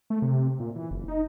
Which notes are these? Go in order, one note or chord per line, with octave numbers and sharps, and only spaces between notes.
A3
C3
A#2
E3
F#1
D#4